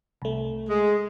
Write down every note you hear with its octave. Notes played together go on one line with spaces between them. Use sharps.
C2 A3
G#3